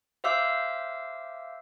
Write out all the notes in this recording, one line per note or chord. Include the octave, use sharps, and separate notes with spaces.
C5 E5 F5 D6 E6 G6